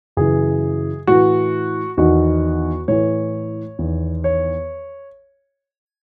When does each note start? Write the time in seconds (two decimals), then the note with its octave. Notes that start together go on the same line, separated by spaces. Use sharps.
0.17 F#2 C#3 E3 G#4
1.07 A2 E3 F#4
1.97 E2 D#3 F#4
2.88 A2 E3 C#5
3.79 E2 D#3
4.24 C#5